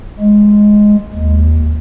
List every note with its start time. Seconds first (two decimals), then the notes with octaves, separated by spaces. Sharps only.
0.19 G#3
1.14 D#2